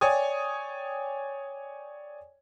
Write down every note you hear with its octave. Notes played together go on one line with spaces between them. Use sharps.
C#5 D5 G5 G#5 D#6